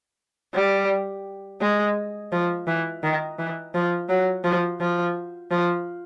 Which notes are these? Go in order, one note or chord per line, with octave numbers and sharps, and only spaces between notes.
G3
G#3
F3
E3
D#3
E3
F3
F#3
F3
F3
F3